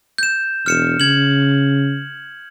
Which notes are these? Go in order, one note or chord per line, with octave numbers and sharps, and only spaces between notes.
G6 E7
E1 F6 C#7 E7
C#3 G#6 F#7